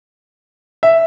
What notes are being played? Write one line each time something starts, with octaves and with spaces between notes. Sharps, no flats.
E5